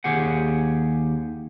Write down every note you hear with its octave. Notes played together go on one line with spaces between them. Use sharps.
D#2 G4 G#4 F#5